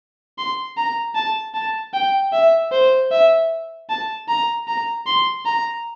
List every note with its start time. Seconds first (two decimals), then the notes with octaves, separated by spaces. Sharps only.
0.38 C6
0.77 A#5
1.15 A5
1.54 A5
1.93 G5
2.33 E5
2.72 C5
3.11 E5
3.90 A5
4.28 A#5
4.68 A#5
5.07 C6
5.46 A#5